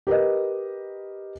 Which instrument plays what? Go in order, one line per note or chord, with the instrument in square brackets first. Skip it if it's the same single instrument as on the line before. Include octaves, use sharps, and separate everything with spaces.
[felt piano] G4 A#4 B4 D#5